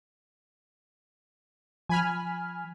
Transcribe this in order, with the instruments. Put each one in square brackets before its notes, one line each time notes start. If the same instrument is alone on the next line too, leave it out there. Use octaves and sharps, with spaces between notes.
[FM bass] F3 [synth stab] G#5 B5 F6